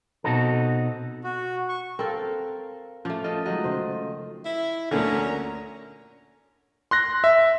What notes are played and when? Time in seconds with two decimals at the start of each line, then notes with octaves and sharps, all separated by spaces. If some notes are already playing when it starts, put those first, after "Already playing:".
0.24 B2 C4 D#4 F#4 A4
1.24 F#4
1.69 C#6
1.99 C4 A4 A#4 F5
3.05 F3 A3 C#4 F5 D6
3.24 F4 A4 D#5
3.46 D#3 F3 F#3 G#3 D#5
3.64 C#3 F3 C5
4.45 E4
4.91 D2 A#2 D3 C#4 A#4 C#5 A#5
6.91 C6 F#6 A#6
7.24 E5